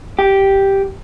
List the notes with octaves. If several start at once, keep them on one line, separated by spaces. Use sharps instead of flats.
G4